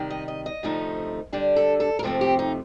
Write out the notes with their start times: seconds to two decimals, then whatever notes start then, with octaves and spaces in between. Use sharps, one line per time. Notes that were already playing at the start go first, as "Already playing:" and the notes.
Already playing: C3 D#3 G3
0.10 D#5
0.28 D#5
0.46 D#5
0.63 D2 C3 F3 A3 D#4
1.33 D3 G3 D4
1.56 A4
1.80 A4
1.99 A#4
2.03 F2 C3 F3 A3 C4 A4
2.21 G4
2.39 D#4